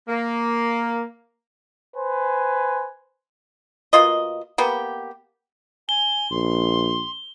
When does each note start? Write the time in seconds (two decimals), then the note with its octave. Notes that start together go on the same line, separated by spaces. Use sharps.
0.08 A#3
1.96 B4 C5 G#5
3.93 B2 A#3 F4 D#5
4.58 A#3 B3 G4
5.89 G#5 G7
6.31 A#1 C6